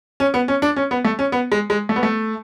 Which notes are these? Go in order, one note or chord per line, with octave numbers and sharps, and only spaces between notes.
C#4
B3
C#4
D4
C#4
B3
A3
C#4
B3
G#3
G#3
A3
B3
A3